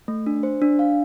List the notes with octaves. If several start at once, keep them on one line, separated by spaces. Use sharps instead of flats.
A3
D4
C5
D4
F5